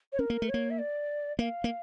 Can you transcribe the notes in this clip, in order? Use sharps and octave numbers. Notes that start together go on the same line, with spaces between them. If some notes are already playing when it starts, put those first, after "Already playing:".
C#5
C#4 A#4
A#3
A3
C#5
A#3
E5
D5
A#3 F5
A#3